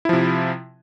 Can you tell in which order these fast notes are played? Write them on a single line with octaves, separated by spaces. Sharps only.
E4 F3 C3